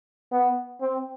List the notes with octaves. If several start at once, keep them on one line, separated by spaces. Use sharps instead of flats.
B3
C4